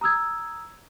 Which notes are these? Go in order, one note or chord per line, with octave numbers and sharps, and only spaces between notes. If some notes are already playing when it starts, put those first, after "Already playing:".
A#5 D#6 E6 G#6